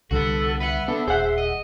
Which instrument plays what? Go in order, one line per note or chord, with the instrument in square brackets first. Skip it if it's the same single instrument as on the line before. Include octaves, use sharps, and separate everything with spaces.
[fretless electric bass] C2 D3 G3 [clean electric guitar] B3 F#4 [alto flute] A4
[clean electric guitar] B4 F#5 [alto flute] E5
[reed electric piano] B3 [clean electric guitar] D4 A4
[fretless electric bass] D#1 [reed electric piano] G#4 F#5 [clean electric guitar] C5
[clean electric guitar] D#5